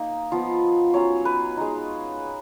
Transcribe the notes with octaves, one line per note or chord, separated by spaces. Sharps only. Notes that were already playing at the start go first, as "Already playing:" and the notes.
Already playing: A#3 D#4
F3 B3 F4
F#3 C#4 F4 C#5
B4
G#3 D#4